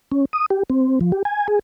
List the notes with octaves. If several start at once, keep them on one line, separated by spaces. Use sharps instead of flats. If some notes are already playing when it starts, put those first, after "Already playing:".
C#4
D#6
G4
C4
F3
G4
G#5
G#4